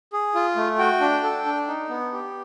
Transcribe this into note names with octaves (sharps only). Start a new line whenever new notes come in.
G#4
F4
A3
F#4 G5
D4
A4
D4
D#4
B3
G4